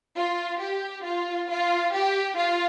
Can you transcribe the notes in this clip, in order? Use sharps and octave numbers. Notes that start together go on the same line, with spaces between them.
F4
G4
F4
F4
G4
F4